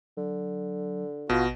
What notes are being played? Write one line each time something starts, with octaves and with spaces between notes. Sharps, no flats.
D3 F#3
A1 B2 F4 F#4